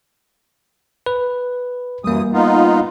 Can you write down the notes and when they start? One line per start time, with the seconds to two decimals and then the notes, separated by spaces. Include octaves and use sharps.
1.06 B4
2.04 F#2 E3 G3 A#3 D#6
2.33 B3 D#4 F4